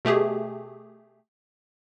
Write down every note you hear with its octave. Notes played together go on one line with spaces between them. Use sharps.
B2 A3 G4 G#4